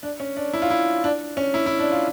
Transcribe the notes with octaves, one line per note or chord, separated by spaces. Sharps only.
D4
C#4
D4
E4
F4
E4
D4
C#4
E4
E4
D4
F4